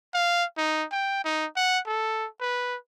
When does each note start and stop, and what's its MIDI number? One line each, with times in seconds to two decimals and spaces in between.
0.14 0.44 77
0.57 0.85 63
0.92 1.23 79
1.25 1.46 63
1.57 1.79 78
1.86 2.26 69
2.41 2.76 71